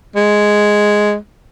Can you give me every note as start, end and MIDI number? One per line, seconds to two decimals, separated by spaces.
0.16 1.16 56